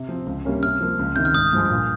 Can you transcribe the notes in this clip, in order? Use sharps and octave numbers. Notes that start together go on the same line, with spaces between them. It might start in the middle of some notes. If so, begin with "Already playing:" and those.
Already playing: C3
F3 C4
C#2
C3 G3 A#3 C#4
C3 F6
F3 A#3
C#2
C3 D#3 G6
F6
G#1 D#6
G2 F3 G#3
A#2